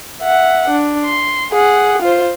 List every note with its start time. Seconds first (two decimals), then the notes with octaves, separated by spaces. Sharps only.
0.22 E5 F#5
0.69 D4
1.05 C6
1.52 G#4 F#5
2.02 F4 C5